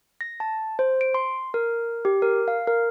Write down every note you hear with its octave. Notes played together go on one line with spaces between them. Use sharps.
A#6
A5
C5
D7
C6
A#4
G4
A#4
F5
A#4